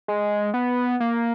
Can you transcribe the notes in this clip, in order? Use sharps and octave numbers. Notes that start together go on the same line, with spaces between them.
G#3
B3
A#3